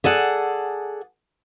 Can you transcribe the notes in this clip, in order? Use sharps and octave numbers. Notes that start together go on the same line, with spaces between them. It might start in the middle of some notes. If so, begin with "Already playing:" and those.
G#4 A4 D5 F#5